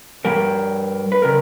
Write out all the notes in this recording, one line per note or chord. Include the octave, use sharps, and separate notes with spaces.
G2 D#3 G3 A#4
B4
C#3 A#4